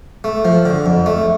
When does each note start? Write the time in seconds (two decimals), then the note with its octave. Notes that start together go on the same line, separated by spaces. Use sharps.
0.24 A3
0.45 F3
0.66 D3
0.86 F2
1.06 A3